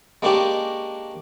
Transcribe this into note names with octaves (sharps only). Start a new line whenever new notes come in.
G#3 A#3 C#4 D4 G4